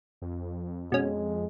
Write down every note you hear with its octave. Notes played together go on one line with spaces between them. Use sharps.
F2
B2 G#3 C#4